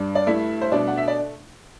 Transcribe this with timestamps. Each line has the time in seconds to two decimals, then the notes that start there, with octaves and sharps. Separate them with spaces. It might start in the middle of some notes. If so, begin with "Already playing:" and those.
Already playing: G2 D4
0.15 D5
0.27 A3 E4 E5
0.62 C5
0.72 B2 D4 D5
0.88 F#5
0.97 E5
1.08 D5